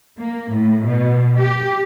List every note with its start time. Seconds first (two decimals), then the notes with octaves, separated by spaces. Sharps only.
0.19 A#3
0.51 A2
0.86 B2
1.40 G4